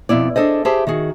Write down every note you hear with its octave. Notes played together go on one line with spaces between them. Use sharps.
F2 B2 E4 D5
D4 G#4 A4 C5 D#5
G4 G#4 C5 E5 A5
D#3 F#4 G#4